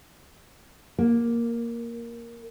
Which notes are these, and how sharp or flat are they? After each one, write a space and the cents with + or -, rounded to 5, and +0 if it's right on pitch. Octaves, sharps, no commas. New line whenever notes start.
A#3 +5